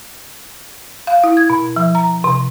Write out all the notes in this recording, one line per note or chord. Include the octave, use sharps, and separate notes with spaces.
F5
E4
G#6
B2
F3
A#5
C3